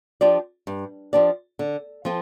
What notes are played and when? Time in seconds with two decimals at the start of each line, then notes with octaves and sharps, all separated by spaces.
0.21 F3 D4 G4 D5
0.67 G2
1.13 F3 D4 G4 D5
1.59 D3
2.05 F3 C4 F4 A4